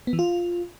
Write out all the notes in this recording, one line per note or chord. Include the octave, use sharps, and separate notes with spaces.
B3
E3
F4